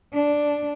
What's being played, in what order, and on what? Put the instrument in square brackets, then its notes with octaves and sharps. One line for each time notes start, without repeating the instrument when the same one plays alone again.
[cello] D4